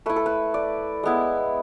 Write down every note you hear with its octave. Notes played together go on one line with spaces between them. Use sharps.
A3 E4 B4
A4
B4
D5
G#3 B3 E4